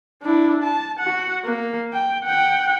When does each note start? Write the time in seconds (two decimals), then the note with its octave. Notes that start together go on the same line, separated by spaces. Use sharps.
0.23 D4 E4
0.63 A5
0.99 F#4 F#5
1.44 A#3
1.93 G5
2.25 F#5 G5